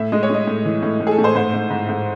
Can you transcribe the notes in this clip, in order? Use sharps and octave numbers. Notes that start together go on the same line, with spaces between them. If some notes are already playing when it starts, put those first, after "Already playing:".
Already playing: A2 E5
G#3 D#5
C#5
G#3 D#5
A2
E3
A2
A2
G#4
A4
A2
C5
G#2 C5
G#2
G#2
G#2